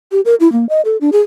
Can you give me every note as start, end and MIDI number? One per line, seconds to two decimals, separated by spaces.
0.12 0.21 67
0.25 0.35 70
0.40 0.51 64
0.52 0.67 58
0.69 0.81 75
0.85 0.97 69
1.01 1.10 62
1.12 1.20 68